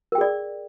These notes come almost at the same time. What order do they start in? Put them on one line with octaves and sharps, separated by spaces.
A#4 G5 G#4 D5